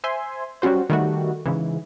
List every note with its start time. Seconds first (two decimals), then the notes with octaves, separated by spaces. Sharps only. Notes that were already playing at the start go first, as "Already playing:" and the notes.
0.04 C5 E5 G#5 C6
0.62 F#3 G3 C#4 F#4 C5
0.90 D#3 G3 A3 F#4
1.46 G#2 C#3 E3